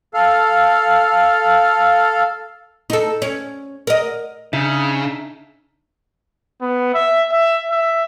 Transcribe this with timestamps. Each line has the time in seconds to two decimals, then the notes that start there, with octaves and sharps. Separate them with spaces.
0.14 A4 F5
2.90 D#4 A4
3.22 C#4
3.87 A#4 D#5
4.53 C#3 D4 D#4 E5
6.61 B3
6.94 E5
7.32 E5
7.71 E5